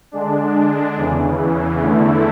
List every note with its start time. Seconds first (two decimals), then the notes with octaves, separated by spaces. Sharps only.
0.12 D3 G#3 D4
0.96 E2 C#3 E3
1.79 E2 D3 A3 E4